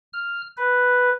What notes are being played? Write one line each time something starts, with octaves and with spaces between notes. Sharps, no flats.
F6
B4